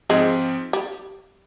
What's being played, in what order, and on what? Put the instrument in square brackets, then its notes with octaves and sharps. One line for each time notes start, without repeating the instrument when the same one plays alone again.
[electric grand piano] G#2 F3 C4 [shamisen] G#3
[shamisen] G3